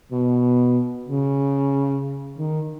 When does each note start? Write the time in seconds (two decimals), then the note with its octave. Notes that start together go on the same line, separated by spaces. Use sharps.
0.12 B2
1.08 C#3
2.38 D#3